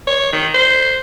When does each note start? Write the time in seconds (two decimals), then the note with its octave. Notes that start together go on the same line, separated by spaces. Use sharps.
0.07 C#5
0.33 D#3
0.54 C5